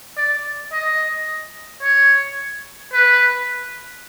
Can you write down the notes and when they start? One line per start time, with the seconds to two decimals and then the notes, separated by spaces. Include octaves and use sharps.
0.17 D5
0.72 D#5
1.82 C#5
2.93 B4